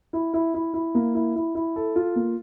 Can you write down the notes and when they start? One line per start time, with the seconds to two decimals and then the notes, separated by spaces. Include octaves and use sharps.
0.13 E4
0.34 E4
0.54 E4
0.74 E4
0.95 A#3
1.15 E4
1.36 E4
1.55 E4
1.76 A4
1.96 F4
2.16 A#3